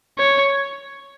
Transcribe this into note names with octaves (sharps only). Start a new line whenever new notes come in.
C#5